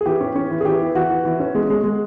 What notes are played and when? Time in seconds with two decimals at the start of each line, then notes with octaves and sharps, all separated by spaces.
0.01 G#4
0.06 E3 G4
0.21 C#4
0.36 C#4
0.51 E3
0.61 G#4
0.65 E3 G4
0.81 E3
0.95 E3 F#4
1.09 E3
1.25 E3
1.40 C#4
1.55 G#3
1.70 G#3
1.84 G#3